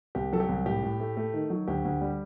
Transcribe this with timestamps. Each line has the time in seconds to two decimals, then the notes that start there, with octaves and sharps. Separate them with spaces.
0.15 C2 G4
0.33 F#3 A4
0.40 G4
0.49 C2
0.66 A2 G4
0.83 A2
1.00 A3
1.17 A3
1.34 D#3
1.50 F#3
1.68 D2 G4
1.85 D2
2.01 G3